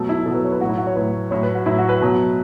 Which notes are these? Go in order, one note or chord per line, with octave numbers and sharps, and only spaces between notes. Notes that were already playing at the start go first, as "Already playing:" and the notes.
Already playing: B2 F#3 A3
E4
B2 A4
F#3 B4
C#5
B4
A2 F#3 F#4
E4
F#4
C#5
A2 F#3 B4
A2 F#3 C#5
B4
F#4
A2 F#3 E4
F#4
B4
B2 F#3